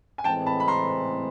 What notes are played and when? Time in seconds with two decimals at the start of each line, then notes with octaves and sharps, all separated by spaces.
0.18 G#5
0.24 A2 E3 G#3 C4 G5 A5
0.46 A5 B5
0.60 B5
0.68 A#5 C6